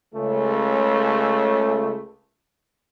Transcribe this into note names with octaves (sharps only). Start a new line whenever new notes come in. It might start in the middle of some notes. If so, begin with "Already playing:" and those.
C#2 C#3 A3